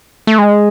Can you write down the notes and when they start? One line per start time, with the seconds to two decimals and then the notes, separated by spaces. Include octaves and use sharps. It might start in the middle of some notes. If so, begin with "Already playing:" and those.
0.27 A3
0.38 G#3